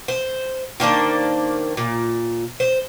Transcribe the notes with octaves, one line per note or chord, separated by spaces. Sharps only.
C5
D#3 A#3 D4 C5
A#2
C5